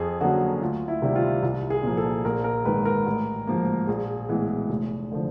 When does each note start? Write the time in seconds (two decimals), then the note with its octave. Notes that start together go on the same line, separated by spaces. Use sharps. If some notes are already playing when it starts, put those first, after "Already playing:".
Already playing: F2 G#4
0.21 D3 F#3 A#3 C#4 F#4
0.61 D2 F4
0.88 E4
1.02 C3 D#3 G3
1.16 F4
1.42 C2
1.70 G#4
1.83 A#2 F3 A#3
1.97 A4
2.25 A#1 A#4
2.44 A#4
2.65 G#2 D#3 G#3 B4
2.85 A#4
3.06 A1
3.47 G#2 F3 A#3
3.87 A#1 G#4
4.28 A2 E3 G#3 B3
4.70 F1
5.12 D3 F3